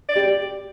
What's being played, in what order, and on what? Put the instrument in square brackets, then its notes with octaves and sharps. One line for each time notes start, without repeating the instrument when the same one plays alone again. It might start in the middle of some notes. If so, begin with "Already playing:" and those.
[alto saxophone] D5
[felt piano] G4